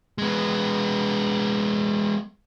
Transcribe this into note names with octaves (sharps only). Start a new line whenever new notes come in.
G#3 B3